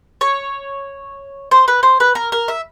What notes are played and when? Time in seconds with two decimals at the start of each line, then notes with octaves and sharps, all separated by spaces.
0.21 C#5
1.51 C5
1.68 B4
1.83 C5
2.00 B4
2.15 A#4
2.32 A#4
2.48 E5